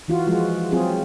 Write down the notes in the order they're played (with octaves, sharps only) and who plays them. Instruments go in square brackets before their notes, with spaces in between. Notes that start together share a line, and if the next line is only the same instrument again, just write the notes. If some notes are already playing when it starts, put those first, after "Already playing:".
[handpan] E3 F4 F#4
F3 G#3 F#4
F#3 C4 F4 G#4